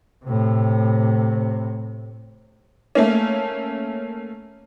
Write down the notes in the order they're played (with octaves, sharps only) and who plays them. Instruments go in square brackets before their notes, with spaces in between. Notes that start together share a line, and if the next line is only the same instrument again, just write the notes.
[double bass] A2 C3
[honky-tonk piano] A3 A#3 C#4